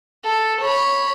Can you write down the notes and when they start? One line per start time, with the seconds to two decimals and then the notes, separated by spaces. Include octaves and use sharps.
0.25 A4
0.61 C#5 B5